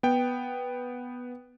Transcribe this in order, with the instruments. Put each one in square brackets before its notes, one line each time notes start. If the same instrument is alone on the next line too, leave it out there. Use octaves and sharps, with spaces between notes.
[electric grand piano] B3 G5